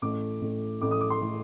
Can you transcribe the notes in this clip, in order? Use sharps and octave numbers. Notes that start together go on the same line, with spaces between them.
A1 A2 A3 D6
A1 A2 A3
A1 A2 A3 D6
D#6
D6
C6
A2 A3